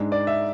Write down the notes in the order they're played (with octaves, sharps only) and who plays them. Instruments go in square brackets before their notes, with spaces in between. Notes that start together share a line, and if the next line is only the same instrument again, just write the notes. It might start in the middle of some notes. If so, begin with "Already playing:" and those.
Already playing: [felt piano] G#2 G#3 D4
[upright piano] D5
E5